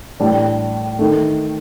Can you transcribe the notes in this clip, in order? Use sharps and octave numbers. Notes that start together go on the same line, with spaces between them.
A2 G3 D4
D#3 A3